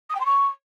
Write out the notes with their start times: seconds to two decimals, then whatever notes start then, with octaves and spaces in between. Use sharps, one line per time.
0.09 D#6
0.15 G5
0.20 C6
0.25 C#6